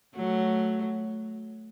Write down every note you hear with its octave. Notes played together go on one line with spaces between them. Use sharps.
F#3 A3